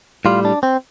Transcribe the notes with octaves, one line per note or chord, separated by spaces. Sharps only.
A2 G3 F4
D4
C4